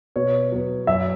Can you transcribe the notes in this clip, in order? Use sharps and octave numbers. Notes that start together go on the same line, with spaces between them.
B2 C#5
F#3 B3
F#2 E5